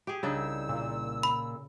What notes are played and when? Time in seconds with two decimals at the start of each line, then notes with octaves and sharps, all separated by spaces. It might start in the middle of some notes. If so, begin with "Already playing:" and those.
0.07 G4 G#4
0.23 C2 C#3 D4 D#4 E6
0.69 A#2
1.23 B5